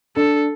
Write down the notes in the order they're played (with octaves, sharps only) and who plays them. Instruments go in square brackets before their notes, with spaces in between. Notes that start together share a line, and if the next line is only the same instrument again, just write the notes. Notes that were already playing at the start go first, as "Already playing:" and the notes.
[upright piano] D4 [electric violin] A4